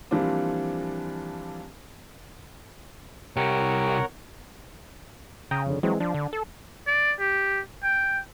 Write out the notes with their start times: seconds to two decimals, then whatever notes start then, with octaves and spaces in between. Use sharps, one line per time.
0.11 E3 F3 G3 A#3 C4 D4
3.36 C2 G4 A#4 C#5 F#5
5.51 C#3 G5 A#5 D#6
5.66 F2 D3
5.83 E3 F#3 G#3 C4
6.00 F3 D4
6.14 D3
6.33 A4
6.87 D5
7.20 G4
7.84 G5